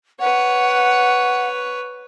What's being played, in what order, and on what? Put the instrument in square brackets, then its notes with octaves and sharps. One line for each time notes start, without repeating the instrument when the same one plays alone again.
[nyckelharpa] B4 C#5 [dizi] F#5